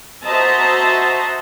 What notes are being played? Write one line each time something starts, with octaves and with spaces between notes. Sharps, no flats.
F#4 C5 D#5 E5 A5 A#5